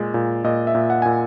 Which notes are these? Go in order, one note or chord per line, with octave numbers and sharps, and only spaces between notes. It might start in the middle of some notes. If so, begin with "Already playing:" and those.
Already playing: A#2 G#3
A#2
A#2 D#5
E5
A#2
F#5
A#2 G#5